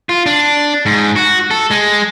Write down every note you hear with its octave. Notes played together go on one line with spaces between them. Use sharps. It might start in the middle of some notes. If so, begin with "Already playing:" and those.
F4
D4
G#2
F#4
A4
G#3